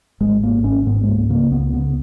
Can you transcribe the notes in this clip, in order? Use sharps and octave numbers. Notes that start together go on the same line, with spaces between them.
G#1 G#3
G#2 A#3
G#1 C#4
G#2 B3
G#3
C#2 A#3
C#3 A#3
C#2 B3
C#3 B3